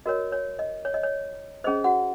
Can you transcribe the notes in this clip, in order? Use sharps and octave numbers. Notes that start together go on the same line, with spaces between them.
F#4 A#4 C#5 D#5
C#5
D#5
C#5
D#5
C#5
C#4 G#4 C5 D#5
F#4 F#5